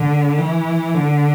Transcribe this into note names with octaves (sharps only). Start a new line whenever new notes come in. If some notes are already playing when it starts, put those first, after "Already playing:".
Already playing: D3
E3
D3